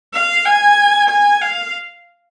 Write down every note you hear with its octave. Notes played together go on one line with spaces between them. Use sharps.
F5
G#5
G#5
F5